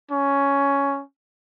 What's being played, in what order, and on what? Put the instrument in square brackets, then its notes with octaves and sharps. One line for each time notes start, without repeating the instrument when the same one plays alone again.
[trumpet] C#4